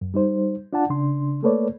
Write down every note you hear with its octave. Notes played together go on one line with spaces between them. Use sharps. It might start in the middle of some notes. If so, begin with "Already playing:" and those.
F#2
G3 D#4 C5
D4 F4 D5 F#5 A5
C#3 D4 C6
A3 A#3 A4 B4 C#5 D5